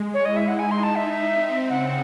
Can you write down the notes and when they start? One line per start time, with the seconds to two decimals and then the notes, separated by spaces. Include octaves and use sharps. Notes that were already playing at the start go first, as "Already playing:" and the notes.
Already playing: G#3
0.14 C#5
0.23 E4 D#5
0.36 E5
0.48 F#5
0.59 D#4 G#5
0.71 C6
0.83 A5
0.95 D#4 E5
1.33 C4
1.69 C#3 F#5